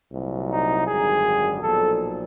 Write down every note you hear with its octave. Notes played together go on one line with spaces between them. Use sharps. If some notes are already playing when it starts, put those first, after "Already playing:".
C2 A#2 F#3
D#4
G#1 F#2 D3 G3 G#4
B1 A#2 F3 A4